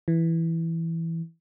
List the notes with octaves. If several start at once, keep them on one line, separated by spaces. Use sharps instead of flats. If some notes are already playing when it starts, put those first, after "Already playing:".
E3